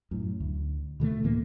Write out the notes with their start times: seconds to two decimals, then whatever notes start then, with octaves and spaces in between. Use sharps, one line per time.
0.11 F#2 A2
0.40 D2
1.00 B2 D3 F3 A3
1.24 D2 A2 E3 A#3